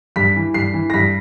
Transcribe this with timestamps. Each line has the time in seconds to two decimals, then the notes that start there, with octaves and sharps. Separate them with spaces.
0.16 G2 B6
0.36 E3
0.54 G2 C7
0.74 E3
0.90 A#6
0.94 G2 B6